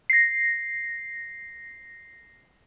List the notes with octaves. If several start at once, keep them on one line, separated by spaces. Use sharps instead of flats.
A#6 C7